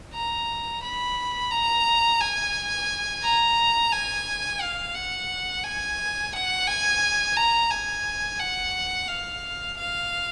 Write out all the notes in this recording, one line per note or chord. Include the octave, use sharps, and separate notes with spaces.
A#5
B5
A#5
G#5
A#5
G#5
F5
F#5
G#5
F#5
G#5
A#5
G#5
F#5
F5
F5